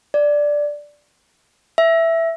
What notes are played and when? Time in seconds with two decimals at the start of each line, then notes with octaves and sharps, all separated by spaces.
0.14 D5
1.78 E5